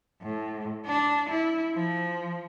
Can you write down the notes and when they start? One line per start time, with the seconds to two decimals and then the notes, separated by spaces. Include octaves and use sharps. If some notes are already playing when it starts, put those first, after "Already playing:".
0.22 A2
0.86 D4
1.30 E4
1.74 F3